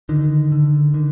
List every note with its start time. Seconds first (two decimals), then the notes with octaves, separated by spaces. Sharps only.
0.09 D3 D#3
0.52 D3
0.94 D3 D#3